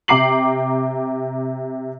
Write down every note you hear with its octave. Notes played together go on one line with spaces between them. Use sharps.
C3 G5 A#5 D6 C7 F#7